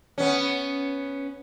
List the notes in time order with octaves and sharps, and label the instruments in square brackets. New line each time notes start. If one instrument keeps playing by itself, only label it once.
[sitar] B3 C#4